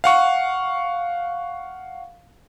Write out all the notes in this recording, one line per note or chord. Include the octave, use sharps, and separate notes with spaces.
F5 F#5 C#6